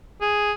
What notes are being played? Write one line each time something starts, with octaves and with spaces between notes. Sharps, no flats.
G#4